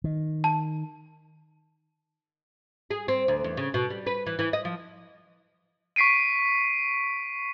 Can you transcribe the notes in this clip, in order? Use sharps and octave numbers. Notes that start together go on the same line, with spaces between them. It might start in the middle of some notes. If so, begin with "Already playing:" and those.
D#3
A5
G#4
C4
D2
E2
C#3
B2
G3
B4
E3
E3
D#5
F3
C#6 B6 C7 D7 D#7